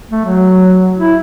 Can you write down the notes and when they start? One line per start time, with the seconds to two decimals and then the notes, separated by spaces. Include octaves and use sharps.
0.11 A3
0.25 F#3
0.98 E4